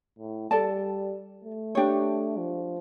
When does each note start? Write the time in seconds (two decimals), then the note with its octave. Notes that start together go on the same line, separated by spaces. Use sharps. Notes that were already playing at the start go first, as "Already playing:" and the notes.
0.19 A2
0.50 G3 A4 D5 A5
1.44 A3
1.75 D4 G4 C#5
2.38 F3